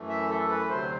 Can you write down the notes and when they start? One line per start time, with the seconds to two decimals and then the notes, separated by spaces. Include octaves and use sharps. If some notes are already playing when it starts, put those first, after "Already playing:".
Already playing: F#2 E3 A3
0.09 E5
0.30 A4
0.49 B4
0.70 D2 C3 F#3 C5